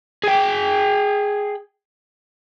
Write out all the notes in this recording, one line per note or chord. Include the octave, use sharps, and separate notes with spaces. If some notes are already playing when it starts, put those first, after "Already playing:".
G#4 G5